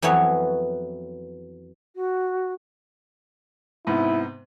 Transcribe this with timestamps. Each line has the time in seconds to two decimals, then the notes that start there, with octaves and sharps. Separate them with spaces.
0.02 F2 E3 F#3 B3 C#5
1.95 F#4
3.87 G#2 C3 B3 E4